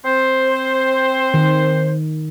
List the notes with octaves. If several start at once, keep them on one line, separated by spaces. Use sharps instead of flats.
C4 C5
D#3